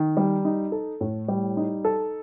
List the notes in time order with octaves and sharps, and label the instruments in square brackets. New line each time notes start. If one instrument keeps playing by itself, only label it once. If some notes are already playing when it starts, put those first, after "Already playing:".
Already playing: [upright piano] D#3
G3
D#4
A4
A2
G3
D#4
A4